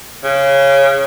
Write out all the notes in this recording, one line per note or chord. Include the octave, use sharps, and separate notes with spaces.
C#3